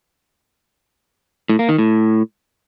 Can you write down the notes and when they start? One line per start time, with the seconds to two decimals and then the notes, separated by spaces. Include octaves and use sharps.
1.49 A2
1.59 A#3
1.69 D#3
1.78 A2